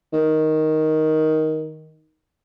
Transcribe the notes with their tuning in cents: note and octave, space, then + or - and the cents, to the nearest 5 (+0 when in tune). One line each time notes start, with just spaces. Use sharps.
D#3 +5